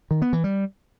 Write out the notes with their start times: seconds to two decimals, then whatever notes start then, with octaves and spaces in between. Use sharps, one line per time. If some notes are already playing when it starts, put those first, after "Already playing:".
0.11 D#3
0.22 B3
0.33 E3
0.44 G3